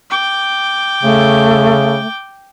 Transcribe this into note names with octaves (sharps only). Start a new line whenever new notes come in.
G5 D6
C#3 A3